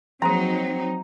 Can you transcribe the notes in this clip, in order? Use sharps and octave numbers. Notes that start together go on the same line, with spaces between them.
F3 F#3 A#3 C4 D#4 G#4 A#5